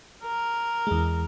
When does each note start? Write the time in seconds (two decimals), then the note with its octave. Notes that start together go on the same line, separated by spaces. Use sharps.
0.24 A#4
0.87 E2 G#3